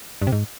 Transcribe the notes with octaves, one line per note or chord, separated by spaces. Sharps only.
G2
C3
G#2